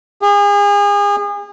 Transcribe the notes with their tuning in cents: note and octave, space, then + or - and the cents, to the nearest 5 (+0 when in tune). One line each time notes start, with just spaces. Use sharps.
G#4 -35